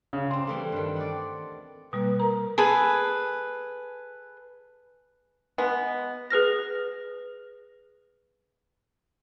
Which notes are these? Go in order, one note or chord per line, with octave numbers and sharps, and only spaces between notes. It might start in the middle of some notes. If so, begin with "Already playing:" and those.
C#3
C4 D4 C6
E3 G3 A3
G2 D#3
D5 F#5
B2 G3 A#3 B4
A#4 A#5
G#4 A4 B4
G#3 B3
G#4 B4 F6 A#6